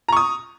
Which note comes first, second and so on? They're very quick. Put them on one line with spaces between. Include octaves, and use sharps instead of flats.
A#5 C#6 D#6